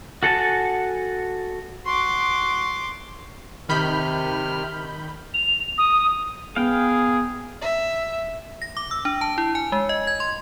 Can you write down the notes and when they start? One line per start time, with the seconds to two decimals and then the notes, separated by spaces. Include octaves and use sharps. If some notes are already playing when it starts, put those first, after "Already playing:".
0.23 F#4 A4 F#5 G#5 A5
1.86 F#4 C6 D6
3.69 C3 D#3 B5 F6 G6
5.34 F7
5.78 D#6
6.56 B3 G#4 F5 G5
7.62 E5
8.62 A#6
8.77 D6
8.91 E6
9.05 D4
9.21 A5
9.38 E4
9.55 G#5
9.72 G#3
9.89 D#5
10.07 G#6
10.20 C6